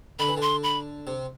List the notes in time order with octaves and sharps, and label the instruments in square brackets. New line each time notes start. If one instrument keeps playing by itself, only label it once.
[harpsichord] D3 [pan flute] B5
[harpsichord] E3
[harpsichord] D3 [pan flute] C6
[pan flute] B5
[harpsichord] C3